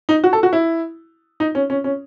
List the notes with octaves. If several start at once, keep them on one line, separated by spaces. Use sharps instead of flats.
D#4
F#4
A4
F#4
E4
D#4
C#4
C#4
C#4